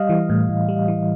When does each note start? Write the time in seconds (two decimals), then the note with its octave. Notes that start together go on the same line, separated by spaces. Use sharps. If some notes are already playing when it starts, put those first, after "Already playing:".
Already playing: G3 D#5 F5
0.09 E3
0.30 A2
0.49 A2
0.69 G3
0.88 E3